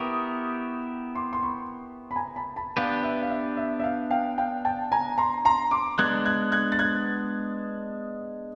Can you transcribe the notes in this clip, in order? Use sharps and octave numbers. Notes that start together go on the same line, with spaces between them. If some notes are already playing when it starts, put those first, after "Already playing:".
Already playing: B3 E4 G4 A#4 C#6 D#6
C6 D6
C6
B5 C#6
B5
G#5 A#5
A5 B5
A5 B5
B3 D4 G4 B4 F5
E5
F5
E5
E5
E5
F5
F5 G5
F5 G5
G5 A5
G#5 A#5
A#5 C6
A#5 C6
C6 D6
G#3 B3 D4 F#6 G#6
F#6 G#6
F#6 G#6
A6
F#6 G#6